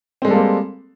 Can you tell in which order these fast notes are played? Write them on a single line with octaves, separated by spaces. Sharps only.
C4 G#3 G3 A4 A#3